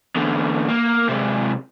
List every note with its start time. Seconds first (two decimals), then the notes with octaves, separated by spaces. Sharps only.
0.16 E2 D3
0.68 A#3
1.09 C3 G#3